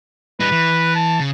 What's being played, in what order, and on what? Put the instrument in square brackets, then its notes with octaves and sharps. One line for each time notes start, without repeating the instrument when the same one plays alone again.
[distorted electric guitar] G3 D#4 [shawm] B4
[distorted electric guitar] E3
[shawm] A5
[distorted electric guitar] C#3